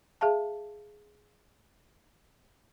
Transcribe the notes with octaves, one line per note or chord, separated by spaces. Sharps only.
G#4 E5 F5 A5